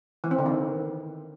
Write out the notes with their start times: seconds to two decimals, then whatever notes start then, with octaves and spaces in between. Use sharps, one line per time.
0.24 E3
0.31 C4
0.38 D3
0.46 D#3